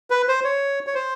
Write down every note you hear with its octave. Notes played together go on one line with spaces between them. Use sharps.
B4
C5
C#5
C#5
C5